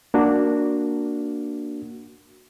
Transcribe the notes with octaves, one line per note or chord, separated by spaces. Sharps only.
A#3 D4 F#4